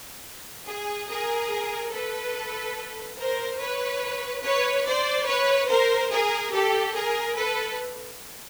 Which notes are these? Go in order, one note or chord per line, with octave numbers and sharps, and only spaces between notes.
G#4
G#4 A#4
A4 B4
A#4 C5
B4 C#5
B4 C#5
C5 D5
B4 C#5
A#4 C5
G#4 A#4
G4 A4
G#4 A#4
A4 B4